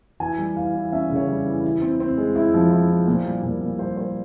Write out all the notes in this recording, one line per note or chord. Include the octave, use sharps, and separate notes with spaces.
E3 G#5
G3
E3 F5
E3
C#4 E5
C#3
C#5
G3
E3
E4
C4
C4
G#3
E4
F3
E4
E4
A#2 C5
G3
A#2 A#4
A#2
G3 C5
G3 C5